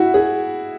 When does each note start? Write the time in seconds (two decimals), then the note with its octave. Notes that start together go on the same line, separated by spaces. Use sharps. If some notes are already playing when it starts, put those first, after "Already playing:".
Already playing: E4 F#4
0.14 G#4